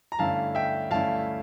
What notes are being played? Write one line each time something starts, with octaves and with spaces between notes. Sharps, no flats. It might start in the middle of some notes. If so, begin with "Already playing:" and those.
A#5
G2 D3 A3 C#4 E4 F5 A5
E5 G5
G2 D3 A3 C#4 E4 F5 A5